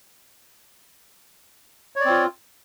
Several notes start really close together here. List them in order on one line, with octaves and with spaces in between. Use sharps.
C#5 D5 C4 F4